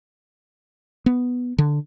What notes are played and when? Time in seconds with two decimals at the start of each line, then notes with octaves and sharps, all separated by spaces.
1.06 B3
1.58 D3